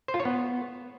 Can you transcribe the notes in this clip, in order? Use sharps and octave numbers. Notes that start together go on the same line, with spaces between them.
C5
F4
C#5
B3